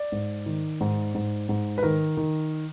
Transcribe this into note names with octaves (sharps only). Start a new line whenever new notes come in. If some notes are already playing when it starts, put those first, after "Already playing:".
Already playing: D5
G#2
D#3
G#2
G#2
G#2
B4
D#3 A#4
D#3